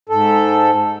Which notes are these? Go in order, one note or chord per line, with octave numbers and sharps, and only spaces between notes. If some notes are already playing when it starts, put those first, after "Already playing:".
G#2 A4